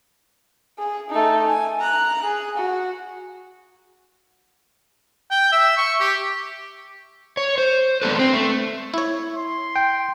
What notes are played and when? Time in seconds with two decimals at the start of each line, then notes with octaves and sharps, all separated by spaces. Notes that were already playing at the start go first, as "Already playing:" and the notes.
0.79 G#4
1.10 A3 D#4
1.47 G#5
1.80 A#5 F#6
2.24 G#4
2.57 F#4
5.31 G5
5.52 E5
5.77 C#6
6.00 G4
7.37 C#5
7.58 C5
8.02 G#3 B3 D4 A4 B4
8.19 C4
8.33 A3
8.94 E4 C#5
9.37 C6
9.76 G5